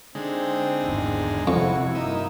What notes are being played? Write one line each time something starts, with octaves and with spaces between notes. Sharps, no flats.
D3 G#3 C4 D#4
G#1 E2
F2 C3 E4 F#4 C#6
G2 A#3 D#4 D#5 E5